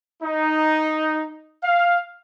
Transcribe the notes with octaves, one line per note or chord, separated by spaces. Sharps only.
D#4
F5